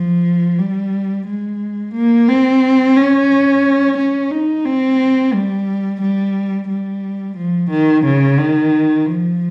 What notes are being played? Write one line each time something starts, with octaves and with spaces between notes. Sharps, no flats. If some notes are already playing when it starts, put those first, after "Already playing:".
Already playing: F3
G3
G#3
A#3
C4
C#4
C#4
D#4
C4
G3
G3
G3
F3
D#3
C#3
D#3
F3